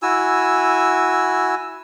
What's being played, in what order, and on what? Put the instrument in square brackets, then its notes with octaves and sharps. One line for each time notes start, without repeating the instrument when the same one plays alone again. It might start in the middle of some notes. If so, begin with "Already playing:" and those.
[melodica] E4 F#4 G#5 E6